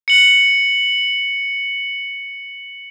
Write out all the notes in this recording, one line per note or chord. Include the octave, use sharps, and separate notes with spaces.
C#7 F#7